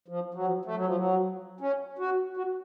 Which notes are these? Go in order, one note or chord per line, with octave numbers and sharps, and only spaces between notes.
F3
F#3
F3
A3
F#3
F3
F#3
C#4
F#4
F#4